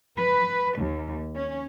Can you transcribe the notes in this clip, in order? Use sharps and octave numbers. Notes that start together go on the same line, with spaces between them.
B4
D#2
C#4